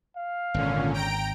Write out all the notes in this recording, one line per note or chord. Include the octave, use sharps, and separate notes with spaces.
F5
G#1 A#2 D3 C#4
G5 A#5 D7